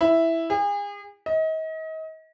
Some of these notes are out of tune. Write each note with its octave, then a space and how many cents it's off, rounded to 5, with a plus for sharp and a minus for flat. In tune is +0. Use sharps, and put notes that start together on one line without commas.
E4 +0
G#4 -35
D#5 +35